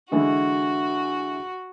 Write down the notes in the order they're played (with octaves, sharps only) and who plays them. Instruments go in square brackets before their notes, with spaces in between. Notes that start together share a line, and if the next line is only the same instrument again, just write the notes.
[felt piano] D3 E3 G#3 [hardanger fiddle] F#4